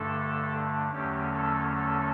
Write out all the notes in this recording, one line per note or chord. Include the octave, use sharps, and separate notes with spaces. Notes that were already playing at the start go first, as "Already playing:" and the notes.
Already playing: G2 D3 A3 D4 A4
E2 D3 F#3 A3 C#4 G4
A4
A4